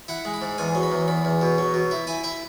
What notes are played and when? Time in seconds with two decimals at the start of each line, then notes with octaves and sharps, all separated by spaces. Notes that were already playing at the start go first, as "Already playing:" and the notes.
0.08 E4 F#5
0.25 G#3
0.34 B5
0.42 G#2
0.58 E2 G#5
0.75 F#3
0.83 B5
0.92 E2
1.08 E2 B5
1.25 E2
1.41 B2
1.58 F#3
1.74 B2
1.91 E4
2.07 E4 G#5
2.24 E4 E5